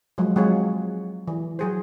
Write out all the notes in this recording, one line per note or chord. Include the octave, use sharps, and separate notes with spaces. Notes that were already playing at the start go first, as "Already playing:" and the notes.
F3 F#3 G#3
F#3 G#3 C4 F4 G#4 C#5
E3
F#3 G#4 C5